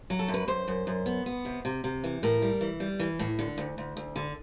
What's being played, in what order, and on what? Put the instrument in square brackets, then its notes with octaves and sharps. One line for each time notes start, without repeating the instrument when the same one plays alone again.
[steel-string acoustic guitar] F#3
A4
F#2
B4
F#2 C5
F#2
F#2
B3
B3
C3
C3
C3
E3
A2 A#4
G3
E3
G3
E3
A2
D3
D2
D2
D2
D3